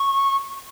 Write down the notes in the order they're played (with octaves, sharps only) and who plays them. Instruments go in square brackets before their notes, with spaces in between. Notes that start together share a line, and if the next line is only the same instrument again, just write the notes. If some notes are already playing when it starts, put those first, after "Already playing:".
Already playing: [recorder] C#6